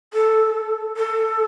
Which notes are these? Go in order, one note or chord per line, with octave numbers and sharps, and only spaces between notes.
A4
A4